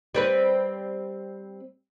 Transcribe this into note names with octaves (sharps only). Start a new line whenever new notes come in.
G3 C4 B4